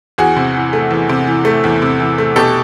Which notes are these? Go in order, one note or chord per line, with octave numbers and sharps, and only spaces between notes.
E2 F#4 G#4
C3
E3
A3
E2
C3
E3
A3
E2
C3
E3
A3
B2 G4 A4